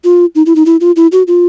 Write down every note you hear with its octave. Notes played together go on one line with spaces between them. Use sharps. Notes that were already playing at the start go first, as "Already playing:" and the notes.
F4
D#4
E4
D#4
E4
F4
E4
F#4
F4